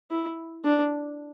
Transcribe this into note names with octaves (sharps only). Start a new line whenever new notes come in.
E4
D4